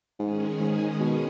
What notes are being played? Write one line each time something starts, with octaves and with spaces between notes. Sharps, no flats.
G#2 D#3 G#3 C#4 G#4
G#2
B2